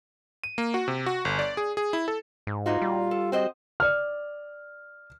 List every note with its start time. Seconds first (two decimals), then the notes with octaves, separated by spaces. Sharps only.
0.44 D#7
0.58 A#3
0.74 F#4
0.88 C3
1.06 F#4
1.25 G1
1.39 D5
1.57 G#4
1.77 G#4
1.93 E4
2.08 A4
2.47 G#2
2.66 A#2 D#4 F4 F#4
2.82 G3
3.11 A4
3.32 C4 F#4 C5 D#5
3.80 D5 F6